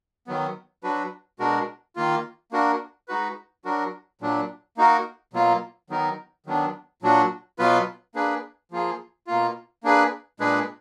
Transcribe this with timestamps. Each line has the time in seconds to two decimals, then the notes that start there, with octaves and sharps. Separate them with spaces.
0.27 D#3 F#3 B3
0.83 F#3 D4 F#4 B4
1.39 B2 G#3 D4 F#4 A#4
1.96 D#3 A#3 F4
2.52 A#3 D4 F#4 A#4
3.08 G#3 D#4 F#4 B4
3.65 F#3 D4 F#4 A#4
4.21 A#2 F#3 D4
4.77 A#3 D#4 F#4 A#4
5.33 B2 F#3 A#3 F4
5.90 D#3 F#3 B3 D#4 A#4
6.46 D#3 F#3 B3 D4
7.02 A#2 F#3 D4 F#4
7.59 B2 F#3 B3 F4 B4
8.15 A#3 D4 G#4 B4
8.71 F3 A#3 F4 G#4
9.27 B2 A#3 F4
9.84 A#3 D4 G#4 B4
10.40 A#2 G#3 D4 G#4 B4